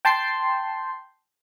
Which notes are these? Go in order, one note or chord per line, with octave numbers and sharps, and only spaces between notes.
G5 A5 C6 G6 C7